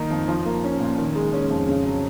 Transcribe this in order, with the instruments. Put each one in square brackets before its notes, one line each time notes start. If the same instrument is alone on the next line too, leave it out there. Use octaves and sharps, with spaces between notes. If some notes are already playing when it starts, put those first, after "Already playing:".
Already playing: [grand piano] D#3 A#3 D#4
F2
F3
A#3
C#4
A#2
D#3
G#3
C#4
F2
C#3
F#3